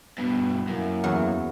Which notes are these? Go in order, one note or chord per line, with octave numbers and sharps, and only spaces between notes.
G2 B2 B3
F#2 A#3 E4
E2 F#3